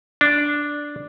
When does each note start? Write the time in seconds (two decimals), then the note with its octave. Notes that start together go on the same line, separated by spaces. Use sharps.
0.21 D4